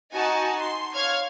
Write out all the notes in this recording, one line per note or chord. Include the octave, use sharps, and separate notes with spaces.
D#4 F#4 G#5 A5
C6
C#5 F5 F6 G#6